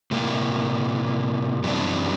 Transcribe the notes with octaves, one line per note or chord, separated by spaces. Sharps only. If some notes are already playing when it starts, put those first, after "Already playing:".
A2 C3 A#3
F#2 E3 G3 B3 C4 D4